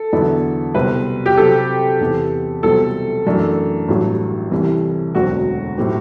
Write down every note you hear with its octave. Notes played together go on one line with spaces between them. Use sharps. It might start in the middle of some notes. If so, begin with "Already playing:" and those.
Already playing: A4
E2 D3 F#3 B3 E4
C2 B2 F#3 C4 B4
G4
C3 F#3 C4 A4
E2 C3 E3 B3
C2 B2 F#3 C4 A4
F#2 E3 A3 D4
A1 G2 F#3
C2 C3 E3
E1 D2 D3 F#3 C4 F#4
A2 F#3 C4 G4